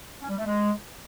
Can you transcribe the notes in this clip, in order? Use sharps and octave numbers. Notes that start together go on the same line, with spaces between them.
C#4
G3
A3
G#3